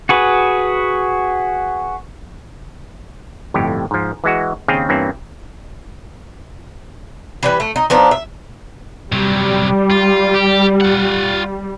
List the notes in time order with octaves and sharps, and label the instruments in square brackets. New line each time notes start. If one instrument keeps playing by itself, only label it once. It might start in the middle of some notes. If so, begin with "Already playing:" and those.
[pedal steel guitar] F#4 G#4 B4
[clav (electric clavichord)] G1 F2 A2 G4
G#2 F3
E3 G#3 F#4
D#2 C#3 C4 G#4 F5 G5
G2 E3 A#3 C4 C#4
[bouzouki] E3 G3 B4
A3
D#4
F3 B3 D4 D#4
E5
[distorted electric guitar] C3 F#3 [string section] G3
[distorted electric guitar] F4
G4
F4 F#5